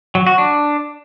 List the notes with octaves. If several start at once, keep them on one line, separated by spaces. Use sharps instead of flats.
F#3
F#4
D4